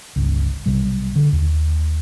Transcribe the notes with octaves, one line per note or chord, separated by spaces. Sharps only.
G1 C#2
B1 C3 G3
D3
D#2